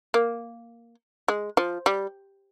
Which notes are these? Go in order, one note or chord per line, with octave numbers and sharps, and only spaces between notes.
A#3
G#3
F3
G3